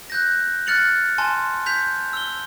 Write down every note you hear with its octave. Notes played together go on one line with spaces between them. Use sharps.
F#6 G6 A#6
F6 F#6 A6 C#7 F7 F#7
G#5 A5 C6
G6 B6 F7
E6 G7